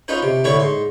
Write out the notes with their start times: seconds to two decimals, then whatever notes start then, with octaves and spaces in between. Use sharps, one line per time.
0.08 C#4 D#4 F4 B4 C5
0.23 C3
0.44 A2 D3 B4 C#5 E5 C#6
0.59 G#2 C6